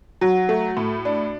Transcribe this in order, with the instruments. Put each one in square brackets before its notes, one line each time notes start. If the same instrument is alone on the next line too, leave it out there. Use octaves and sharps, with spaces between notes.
[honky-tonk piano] F#3 [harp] F#4
[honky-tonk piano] A3
A2
D4